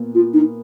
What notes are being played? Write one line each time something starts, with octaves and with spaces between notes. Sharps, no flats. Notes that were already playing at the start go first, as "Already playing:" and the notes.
Already playing: A#2 B3
F4
D#4